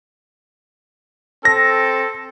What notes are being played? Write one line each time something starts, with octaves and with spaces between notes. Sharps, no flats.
C4 A4 A#6